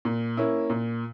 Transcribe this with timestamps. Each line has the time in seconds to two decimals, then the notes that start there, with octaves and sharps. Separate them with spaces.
0.05 A#2
0.37 A#3 C#4 E4
0.70 A#2